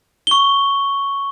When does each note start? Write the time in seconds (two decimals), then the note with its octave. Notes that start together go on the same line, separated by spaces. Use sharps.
0.27 C#6 G7